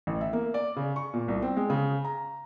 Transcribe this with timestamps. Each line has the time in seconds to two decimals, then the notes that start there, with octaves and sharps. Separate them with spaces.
0.07 A1
0.21 E5
0.33 A#3
0.54 D5
0.76 C#3
0.96 C#6
1.14 A#2
1.28 C2
1.42 C4
1.57 G#3
1.70 C#3
2.05 A#5